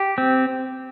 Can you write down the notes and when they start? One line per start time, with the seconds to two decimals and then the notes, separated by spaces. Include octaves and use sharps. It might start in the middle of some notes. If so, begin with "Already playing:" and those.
Already playing: G4
0.18 C4